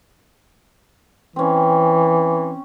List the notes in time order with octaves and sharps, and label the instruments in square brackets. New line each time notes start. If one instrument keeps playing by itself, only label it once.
[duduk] E3 [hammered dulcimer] C4 C#4